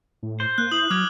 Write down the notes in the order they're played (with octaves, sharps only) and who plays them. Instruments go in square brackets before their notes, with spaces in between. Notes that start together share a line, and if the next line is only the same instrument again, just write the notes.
[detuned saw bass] A2
[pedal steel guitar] C5
[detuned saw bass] A#3 [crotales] F#6
[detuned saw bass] E4 [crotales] D#6 F#7
[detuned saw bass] F#3 [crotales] D6 F6 G#6